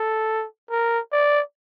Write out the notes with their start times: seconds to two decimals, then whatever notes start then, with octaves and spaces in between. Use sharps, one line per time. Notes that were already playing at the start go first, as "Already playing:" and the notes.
Already playing: A4
0.70 A#4
1.12 D5